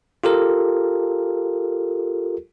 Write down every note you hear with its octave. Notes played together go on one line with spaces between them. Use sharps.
F4 G4 A4 A#4